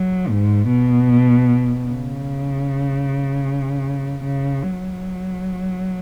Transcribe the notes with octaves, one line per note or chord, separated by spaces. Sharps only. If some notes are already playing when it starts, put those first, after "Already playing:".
Already playing: F#3
G#2
B2
C#3
C#3
F#3